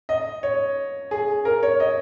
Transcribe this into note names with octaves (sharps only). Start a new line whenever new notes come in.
D#5
C#5
G#4
A#4
C#5
D#5